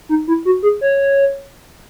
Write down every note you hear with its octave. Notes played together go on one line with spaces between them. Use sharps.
D#4
E4
F#4
G#4
C#5